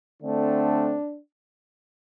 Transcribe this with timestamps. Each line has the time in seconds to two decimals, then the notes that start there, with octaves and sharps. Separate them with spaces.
0.23 D3 A3 C4 D4